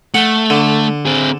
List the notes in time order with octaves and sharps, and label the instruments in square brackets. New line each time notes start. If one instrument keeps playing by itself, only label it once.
[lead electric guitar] A3 [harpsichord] F#5
[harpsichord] D3
[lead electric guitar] C4 G#4